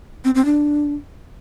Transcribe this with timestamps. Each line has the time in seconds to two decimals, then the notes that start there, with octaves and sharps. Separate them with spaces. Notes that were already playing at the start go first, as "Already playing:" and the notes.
0.25 C4
0.35 C4
0.45 D4